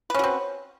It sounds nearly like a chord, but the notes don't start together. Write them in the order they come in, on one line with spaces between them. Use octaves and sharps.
B4 C#4 F#4 C4